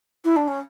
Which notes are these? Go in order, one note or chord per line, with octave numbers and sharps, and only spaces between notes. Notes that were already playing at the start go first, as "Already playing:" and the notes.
E4
D4
C#4